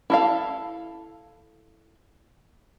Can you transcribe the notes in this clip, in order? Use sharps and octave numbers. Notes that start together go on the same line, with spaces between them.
E4 A4 F5